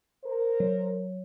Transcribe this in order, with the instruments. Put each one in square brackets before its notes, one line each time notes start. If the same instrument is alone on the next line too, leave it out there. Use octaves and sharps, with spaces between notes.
[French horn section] A#4 C5
[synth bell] F#3